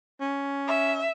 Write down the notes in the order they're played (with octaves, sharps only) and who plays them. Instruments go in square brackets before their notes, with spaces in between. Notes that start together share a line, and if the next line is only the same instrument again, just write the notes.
[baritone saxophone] C#4
[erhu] E5